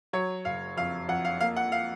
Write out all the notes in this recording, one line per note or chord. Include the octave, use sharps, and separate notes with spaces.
F#3 C#5
F#1 F5
F2 F5
F2 F#5
F5
A#3 F5
F#5
F5